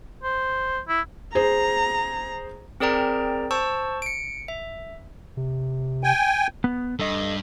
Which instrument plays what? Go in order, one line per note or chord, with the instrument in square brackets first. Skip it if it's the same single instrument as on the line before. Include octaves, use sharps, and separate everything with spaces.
[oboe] C5
E4
[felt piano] G#4 C5 [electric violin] A#5
[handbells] C4 G#4 A#4 D5 G5 A#5
C5 A5 C#6 E6
C#7 D7
E5
[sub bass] C3
[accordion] G5 G#5
[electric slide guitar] B3
[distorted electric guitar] G2 [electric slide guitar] A4 D#5